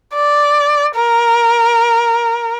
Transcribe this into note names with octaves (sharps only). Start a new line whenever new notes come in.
D5
A#4